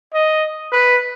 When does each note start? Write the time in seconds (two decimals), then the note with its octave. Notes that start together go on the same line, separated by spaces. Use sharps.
0.14 D#5
0.72 B4